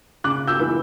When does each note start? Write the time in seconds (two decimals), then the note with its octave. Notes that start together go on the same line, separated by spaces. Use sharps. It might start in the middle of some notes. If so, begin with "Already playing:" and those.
0.24 C#3 D6 F#6
0.47 E6 G6
0.60 E3 B3